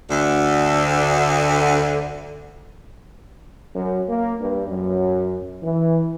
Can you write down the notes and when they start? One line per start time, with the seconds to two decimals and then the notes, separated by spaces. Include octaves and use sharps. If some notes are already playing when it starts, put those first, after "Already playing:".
0.11 D2 D3
3.75 F#2
4.08 A#3
4.40 G2
4.68 F#2
5.62 E3